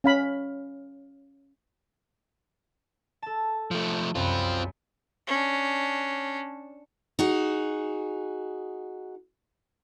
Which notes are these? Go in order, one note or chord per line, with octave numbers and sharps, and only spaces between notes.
C#4 F5 B5
A4 A5
F3 A3 D7 E7
C2 F#2 C4 F4 B5
C#4 D4
D#4 F#4 G#4